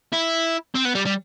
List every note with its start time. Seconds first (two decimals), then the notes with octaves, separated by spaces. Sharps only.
0.13 E4
0.75 C4
0.85 B3
0.95 G3
1.06 G3